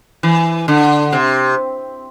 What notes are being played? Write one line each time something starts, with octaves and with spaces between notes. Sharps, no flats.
E3
D3
C3